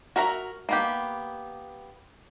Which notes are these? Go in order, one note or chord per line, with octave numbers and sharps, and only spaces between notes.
F#4 A#4 E5 A#5
A#3 B3 G4